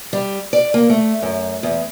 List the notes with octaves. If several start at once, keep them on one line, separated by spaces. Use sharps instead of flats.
G3
D5
A#3
A3
F#2
E2